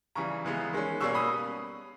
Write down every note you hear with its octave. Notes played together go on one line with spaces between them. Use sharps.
C#3 E3 G3 A#5 C#6
C#3 E3 G#3 B3
D#3 G#3 C#4
B2 G3 A#3 C#4 C#6 E6
B5 D#6